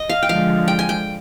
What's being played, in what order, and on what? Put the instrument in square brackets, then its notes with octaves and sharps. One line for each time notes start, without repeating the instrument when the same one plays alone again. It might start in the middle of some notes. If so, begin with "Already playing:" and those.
Already playing: [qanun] D#5
F5
G5
[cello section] D3 F3 G#3 [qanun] F5
[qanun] G5
G#5
G5